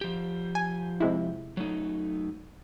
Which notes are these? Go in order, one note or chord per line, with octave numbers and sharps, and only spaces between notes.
F3 G4
G#5
C3 G#3 E4
F#3 A3 D#4